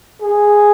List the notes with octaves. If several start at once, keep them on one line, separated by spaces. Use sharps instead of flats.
G#4